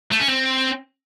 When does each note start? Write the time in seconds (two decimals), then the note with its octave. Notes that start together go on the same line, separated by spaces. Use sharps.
0.12 A3
0.20 C#4
0.28 C4